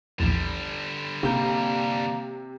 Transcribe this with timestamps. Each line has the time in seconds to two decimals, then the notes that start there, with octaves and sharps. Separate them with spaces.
0.20 A#1 E2 D3 G3
1.23 G#1 C3 A#3 G6